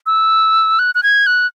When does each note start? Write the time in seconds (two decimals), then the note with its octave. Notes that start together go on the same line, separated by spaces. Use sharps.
0.06 E6
0.79 F#6
0.95 F#6
1.03 G#6
1.26 F#6